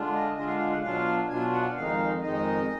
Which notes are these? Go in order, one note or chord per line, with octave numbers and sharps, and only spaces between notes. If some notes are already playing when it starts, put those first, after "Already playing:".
Already playing: D3 G#3 D4 F4
D#5
D3 G#3 D4 F4 D#5
F5
F5
F#5
B2 F#3 D4 F4 F5
B2 F#3 D4 F4 G#5
F#5
F2 D#3 G#3 D#4 F5
F2 D#3 G#3 D#4 D#5